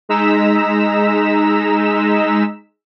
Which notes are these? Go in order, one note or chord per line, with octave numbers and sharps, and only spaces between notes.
G#3 D#4 A#5 E6 B6 E7